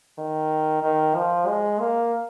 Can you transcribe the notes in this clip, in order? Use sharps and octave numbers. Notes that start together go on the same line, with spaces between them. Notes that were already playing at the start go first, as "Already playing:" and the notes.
D#3
D#3
F3
G#3
A#3